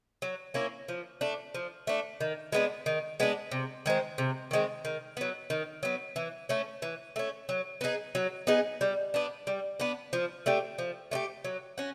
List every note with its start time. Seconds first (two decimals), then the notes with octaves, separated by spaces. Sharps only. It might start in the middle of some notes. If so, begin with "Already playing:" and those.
0.22 F#3
0.54 A#3 C#4 E4
0.88 F3
1.21 A3 D4
1.54 F3
1.87 A3 D4
2.21 D#3
2.52 G#3 B3 D4
2.86 D#3
3.20 G#3 B3 D4
3.51 C3
3.86 D#3 G#3 C4
4.18 C3
4.51 D#3 G#3 C4
4.85 D#3
5.17 F#3 B3
5.50 D#3
5.83 F#3 B3
6.16 E3
6.49 A3 C#4
6.82 E3
7.16 A3 C#4
7.49 F#3
7.81 B3 D#4 G#4
8.15 F#3
8.47 B3 D#4 G#4
8.81 G3
9.14 B3 D4
9.47 G3
9.80 B3 D4
10.13 F3
10.46 A3 D4 G4
10.78 F3
11.11 A3 D4 G4
11.45 F#3
11.78 C#4 F#4